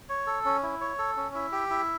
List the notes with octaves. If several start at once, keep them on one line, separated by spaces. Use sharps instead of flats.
C#5
A4
C#4
E4
C#5
A4
C#4
E4
G4
E4